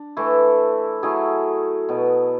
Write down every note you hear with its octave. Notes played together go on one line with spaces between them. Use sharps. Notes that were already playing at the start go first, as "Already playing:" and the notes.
Already playing: D4
E3 A3 E4
F#3 A3 E4 G#4
B2 F#3 B3